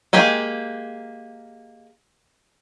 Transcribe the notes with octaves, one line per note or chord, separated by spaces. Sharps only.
G#3 A#3 G4 G#4